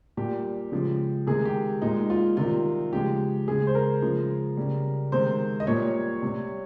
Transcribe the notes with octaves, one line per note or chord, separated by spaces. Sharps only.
A#2 G3 G4
C#3 F3 G#3
C3 D#3 G#3 G#4
G4
A#2 G#3 D#4
F4
C3 D#3 G3 F4
C#3 F3 G#3 G4
C#3 G#3 G#4
C5
A#4
C#3 F3 G#3
C#3 G3
C3 D#3 G#3 C5
D#5
A#2 G3 C#5
C3 G3